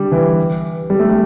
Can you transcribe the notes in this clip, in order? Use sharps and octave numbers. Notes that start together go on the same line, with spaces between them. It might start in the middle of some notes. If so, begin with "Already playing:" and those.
Already playing: D3 G3
E3
G3
A3
G3